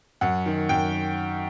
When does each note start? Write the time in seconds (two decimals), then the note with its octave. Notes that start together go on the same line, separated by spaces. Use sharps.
0.21 F#2 F#5
0.46 D#3
0.69 F#2 G5